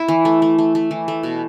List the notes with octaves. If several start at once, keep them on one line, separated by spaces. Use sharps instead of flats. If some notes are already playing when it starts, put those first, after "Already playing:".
Already playing: E4
E3
A3
A3
A3
A3
E3
A3
B2